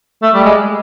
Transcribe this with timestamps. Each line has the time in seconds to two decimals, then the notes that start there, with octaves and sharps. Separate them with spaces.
0.22 A3
0.34 G3
0.44 G#3